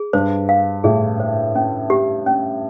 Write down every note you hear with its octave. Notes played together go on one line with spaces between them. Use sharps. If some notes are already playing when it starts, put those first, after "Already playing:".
Already playing: G#4
G2 C5
F5
A2 G#4
C5
C#4
G4
C#4